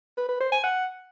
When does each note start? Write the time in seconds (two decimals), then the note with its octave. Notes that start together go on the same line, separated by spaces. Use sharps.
0.17 B4
0.29 B4
0.41 C5
0.52 G#5
0.64 F#5